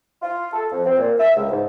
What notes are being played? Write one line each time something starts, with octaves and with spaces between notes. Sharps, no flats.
F4
A4
F2
C4
A#2
E5
C#2
G#2